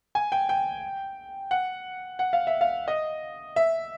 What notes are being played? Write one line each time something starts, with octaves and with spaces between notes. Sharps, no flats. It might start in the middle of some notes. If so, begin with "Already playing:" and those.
G#5
G5
G5
F#5
F#5
F5
E5
F5
D#5
E5